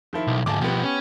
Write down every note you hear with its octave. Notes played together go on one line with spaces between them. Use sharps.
D#3 F3 E4
B1
D2 G#2 G#5 A5 D6
B2 F3 B3 G4
C#4